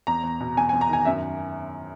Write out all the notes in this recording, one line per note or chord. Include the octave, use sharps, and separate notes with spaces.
E2 A#5
E2
B2
E2 G#5
G#5
E2
A#5
D#3 G#5
F#2 E5